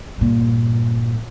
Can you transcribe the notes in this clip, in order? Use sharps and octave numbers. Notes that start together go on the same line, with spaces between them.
G2 A#2